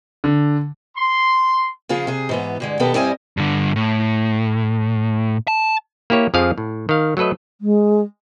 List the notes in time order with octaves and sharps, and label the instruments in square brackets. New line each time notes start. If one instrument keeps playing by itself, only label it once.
[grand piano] D3
[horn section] C6
[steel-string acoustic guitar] C#3 F3 F4 G#4
C3 G#4
G#2 E3 B3
G2 D3 G#3
B2 D#3 B3 G4 A4
G2 G3 C4 E4 D#5 G#5
[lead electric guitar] G2 D3
A2
A5
[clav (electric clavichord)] A#3 E4 G4 C#5
F2 F3 G#4 F5
A2
D#3 F5
F#3 A3 A4 B4 D#5
[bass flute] G#3